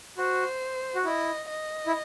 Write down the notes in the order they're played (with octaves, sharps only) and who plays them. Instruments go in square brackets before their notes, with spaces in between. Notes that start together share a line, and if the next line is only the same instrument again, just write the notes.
[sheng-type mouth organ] F#4 [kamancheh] C5
[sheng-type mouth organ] F#4
[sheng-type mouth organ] E4 [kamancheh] D#5
[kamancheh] D#5
[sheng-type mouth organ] E4